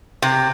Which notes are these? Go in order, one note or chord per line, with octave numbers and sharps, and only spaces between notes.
C3